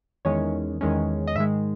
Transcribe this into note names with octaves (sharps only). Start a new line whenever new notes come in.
E2 D#3 G#3 C#4 C#5
E2 D#3 G#3 C#4
D#5
G#2 D#3 G#3 E5